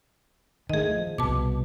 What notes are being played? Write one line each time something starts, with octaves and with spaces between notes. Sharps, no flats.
D#3 A3 G#4 D#5
F3
C2 B2 A5 D6